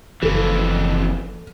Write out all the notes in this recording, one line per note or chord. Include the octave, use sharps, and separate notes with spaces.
F#1 F2 E3 A4